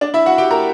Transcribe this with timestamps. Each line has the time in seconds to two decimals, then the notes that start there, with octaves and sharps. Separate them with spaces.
0.01 D4 D5
0.14 E4 E5
0.26 F#4 F#5
0.38 G4 G5
0.51 A#4 A#5